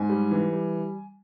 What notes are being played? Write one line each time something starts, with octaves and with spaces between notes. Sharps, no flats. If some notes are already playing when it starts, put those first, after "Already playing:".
Already playing: G#2 G#5
G3
E3
G3